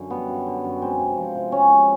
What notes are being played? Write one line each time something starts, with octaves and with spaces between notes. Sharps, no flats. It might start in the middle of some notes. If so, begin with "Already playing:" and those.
Already playing: F#2 D3
G3 B3
F#2
D3
F#2
G#3 C4
C3
F3
C3
G#3 C#4
C3